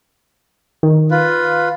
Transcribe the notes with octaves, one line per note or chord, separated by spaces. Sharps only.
D#3
F4 B4